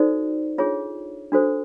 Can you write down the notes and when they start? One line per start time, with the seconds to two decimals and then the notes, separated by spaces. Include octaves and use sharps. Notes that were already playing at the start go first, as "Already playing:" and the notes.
Already playing: D#4 F#4 A4 C5 D5
0.58 D4 F4 G#4 C#5
1.32 D4 F#4 A4 C5